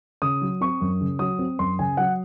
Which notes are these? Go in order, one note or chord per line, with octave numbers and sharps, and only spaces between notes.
C#3 D#6
F#3
C4 C#6
F#2
C#3
F#3 D#6
C4
F#2 C6
C#3 G#5
F#3 F#5